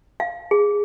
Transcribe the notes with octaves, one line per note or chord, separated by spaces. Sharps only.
F5
G#4